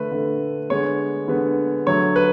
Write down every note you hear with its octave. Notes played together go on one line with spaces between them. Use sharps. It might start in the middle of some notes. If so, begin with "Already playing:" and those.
Already playing: D3 A3 B4
D3 A3
D3 G#3 B3 C#5
D3 G#3 B3
D3 F#3 A3 C#5
B4